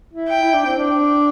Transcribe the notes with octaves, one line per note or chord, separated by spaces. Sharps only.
E4
G5
E4
D4
C4
D4